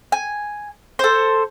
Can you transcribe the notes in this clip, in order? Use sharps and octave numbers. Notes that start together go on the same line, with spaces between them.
G#5
A4 C5